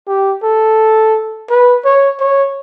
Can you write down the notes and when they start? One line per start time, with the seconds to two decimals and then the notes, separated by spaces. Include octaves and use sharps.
0.08 G4
0.43 A4
1.50 B4
1.85 C#5
2.20 C#5